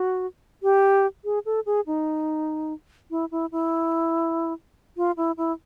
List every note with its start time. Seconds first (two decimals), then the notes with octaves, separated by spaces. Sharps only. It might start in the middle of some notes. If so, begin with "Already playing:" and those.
Already playing: F#4
0.63 G4
1.24 G#4
1.46 A4
1.66 G#4
1.87 D#4
3.11 E4
3.31 E4
3.52 E4
4.97 F4
5.17 E4
5.37 E4